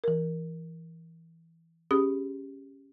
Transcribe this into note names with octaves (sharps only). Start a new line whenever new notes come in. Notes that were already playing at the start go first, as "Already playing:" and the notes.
E3 A#4
C#4 G4 G#4 D#6